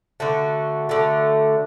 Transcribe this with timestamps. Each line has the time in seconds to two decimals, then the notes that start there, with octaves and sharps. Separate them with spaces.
0.20 D3 A3 F#4
0.89 D3 A3